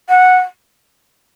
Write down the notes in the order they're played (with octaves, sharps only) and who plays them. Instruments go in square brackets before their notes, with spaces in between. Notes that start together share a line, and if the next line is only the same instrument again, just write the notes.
[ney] F#5